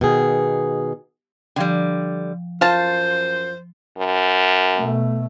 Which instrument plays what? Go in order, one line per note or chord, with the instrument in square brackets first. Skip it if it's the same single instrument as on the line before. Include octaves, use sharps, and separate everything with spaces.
[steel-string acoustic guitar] B2 D#3 G#4
[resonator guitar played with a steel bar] D3 G3 [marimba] F3 G5
[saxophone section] F#2 C5 [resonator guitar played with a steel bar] F4 [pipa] F5 A5
[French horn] F#2
[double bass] B2 A3